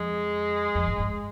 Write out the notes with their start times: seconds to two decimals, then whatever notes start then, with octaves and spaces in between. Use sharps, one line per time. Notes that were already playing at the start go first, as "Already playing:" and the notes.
Already playing: F2 G#3
0.75 F2
0.87 G#2
1.00 G#2